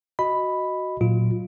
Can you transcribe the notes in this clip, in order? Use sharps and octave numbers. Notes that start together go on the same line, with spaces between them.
F#4 D#5 B5
A#2 F#3 F4